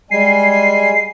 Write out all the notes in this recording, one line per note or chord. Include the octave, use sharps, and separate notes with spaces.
G3 G#3 G#5 C7